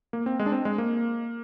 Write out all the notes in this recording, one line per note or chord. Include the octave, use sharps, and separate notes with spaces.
A#3
C4
G#3
D4
C4
G#3
A#3